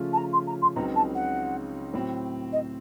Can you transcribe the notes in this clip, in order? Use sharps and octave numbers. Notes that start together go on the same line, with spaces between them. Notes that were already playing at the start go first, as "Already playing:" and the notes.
Already playing: C#3 F3 A3 C#4 F4
A5
A#5
C6
A#5
C6
C#2 C#3 F#3 C4 D#4 A#5
A5
F#5
A2 F#3 C4
D#5